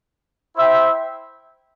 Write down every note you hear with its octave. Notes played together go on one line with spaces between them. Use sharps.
E4 C5 E5 G5